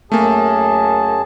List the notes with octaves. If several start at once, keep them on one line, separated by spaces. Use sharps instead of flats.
F#2 A3 A#3 G#4 A5